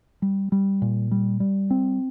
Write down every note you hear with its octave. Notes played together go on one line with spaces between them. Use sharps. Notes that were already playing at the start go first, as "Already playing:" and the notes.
G3
G3
A#2
G3
G3
C4